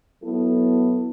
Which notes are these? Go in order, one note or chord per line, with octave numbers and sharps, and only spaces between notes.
F#3 B3 E4 A4